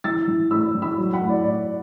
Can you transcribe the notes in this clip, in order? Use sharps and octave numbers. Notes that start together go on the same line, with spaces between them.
E3 E6 A6
E3
A2 B5 E6
E3
B5 E6
F#3
F#5 B5
A2
D5
A2 D5